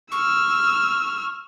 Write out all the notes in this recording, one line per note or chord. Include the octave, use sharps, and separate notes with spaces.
C#6 E6 F6